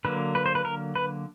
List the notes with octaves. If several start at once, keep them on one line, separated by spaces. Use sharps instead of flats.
D3 F#3 A#3 B4
B4
C5
B4
A#4
B4